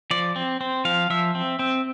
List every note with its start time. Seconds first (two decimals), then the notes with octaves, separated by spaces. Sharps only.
0.11 F3 D5
0.36 C4
0.61 C4
0.85 F3 F5
1.10 F3 E5
1.35 C4
1.59 C4